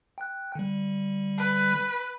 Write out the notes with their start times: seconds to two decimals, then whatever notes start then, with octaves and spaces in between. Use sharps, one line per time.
0.18 G5 F#6
0.55 D3 G3
1.37 B4